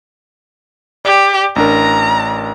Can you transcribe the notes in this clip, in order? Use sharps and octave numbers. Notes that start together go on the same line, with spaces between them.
G4 D5
A1 D4 A#4 A#5